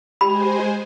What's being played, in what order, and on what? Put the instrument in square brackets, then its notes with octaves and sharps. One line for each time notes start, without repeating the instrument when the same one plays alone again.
[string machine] G#3 G#4 C5 [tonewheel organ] G4 [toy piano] B5